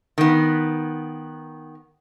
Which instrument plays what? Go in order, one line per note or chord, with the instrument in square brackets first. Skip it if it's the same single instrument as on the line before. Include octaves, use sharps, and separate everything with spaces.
[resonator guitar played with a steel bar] D#3 B3